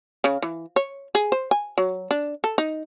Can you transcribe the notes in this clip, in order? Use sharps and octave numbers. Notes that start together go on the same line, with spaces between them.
C#3
E3
C#5
G#4
C5
G#5
F#3
D4
A4
D#4